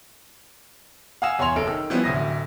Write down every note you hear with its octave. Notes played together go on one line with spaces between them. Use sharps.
F5 F#5 G#5 D#6 E6 E7
E2 C#5 G#5 C6 F7
F#1 A4 D7
D#3 E6
F3 G3 B3 C#4 E4
D1 D2 D#6 A#6